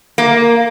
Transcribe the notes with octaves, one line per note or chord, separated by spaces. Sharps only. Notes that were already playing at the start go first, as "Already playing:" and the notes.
A#3